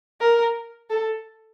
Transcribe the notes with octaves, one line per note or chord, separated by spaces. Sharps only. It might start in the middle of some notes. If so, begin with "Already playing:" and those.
A#4
A4